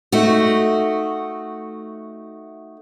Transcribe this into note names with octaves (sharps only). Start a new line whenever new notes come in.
A3 D#4 F#4